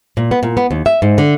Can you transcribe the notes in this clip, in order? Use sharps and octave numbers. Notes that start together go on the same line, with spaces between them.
A#2
B3
A#2
B3
D#2
E5
G#2
D3